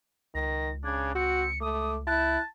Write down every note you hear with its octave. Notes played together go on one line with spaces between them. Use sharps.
C#2 D#3 A#6
C#3 D4 G#6
C4 F#4 C#7
A3 D6 D#6
E4 A5 F#6